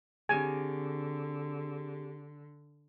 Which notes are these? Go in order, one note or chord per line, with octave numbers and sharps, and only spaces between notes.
D3 C4 G4 G#4 G#5